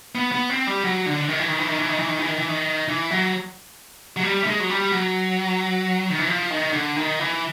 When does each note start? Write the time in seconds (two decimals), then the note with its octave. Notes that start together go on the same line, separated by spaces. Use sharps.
0.15 B3
0.32 B3
0.50 C4
0.67 G3
0.84 F#3
1.06 D3
1.28 D#3
1.39 E3
1.49 D#3
1.59 E3
1.68 D#3
1.79 E3
1.89 D#3
1.99 E3
2.08 D#3
2.19 E3
2.28 D#3
2.39 E3
2.48 D#3
2.88 E3
3.10 F#3
4.17 F#3
4.23 G3
4.43 A3
4.47 G#3
4.60 F#3
4.70 G3
4.92 F#3
6.10 D#3
6.19 E3
6.27 F3
6.50 D#3
6.73 D3
6.96 D#3
7.19 E3